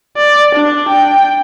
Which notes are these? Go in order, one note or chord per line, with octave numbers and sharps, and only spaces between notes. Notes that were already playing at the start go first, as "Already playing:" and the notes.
D5
D4
G5